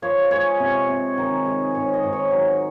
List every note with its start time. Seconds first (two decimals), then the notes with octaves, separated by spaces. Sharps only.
0.02 F3 C#5
0.31 G#3 C#5
0.60 C3
0.88 C3
1.17 D#3
1.46 G#3
1.74 G#2 C#5
1.94 D#5
2.03 G#2
2.13 C#5
2.31 F#3